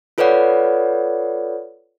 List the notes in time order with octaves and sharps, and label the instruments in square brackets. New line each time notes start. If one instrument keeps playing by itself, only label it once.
[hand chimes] F4 A4 B4 C#5 D5 F#5